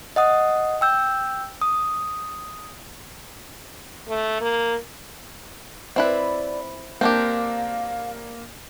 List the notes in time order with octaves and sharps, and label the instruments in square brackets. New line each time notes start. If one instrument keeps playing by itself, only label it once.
[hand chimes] D#5 F#5 D#6
G5 E6 G6
D#6
[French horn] A3
A#3
[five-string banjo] C4 E4 B4 [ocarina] D5
[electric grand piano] A#3 A#4 [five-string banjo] C4 D4 G4 [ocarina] F5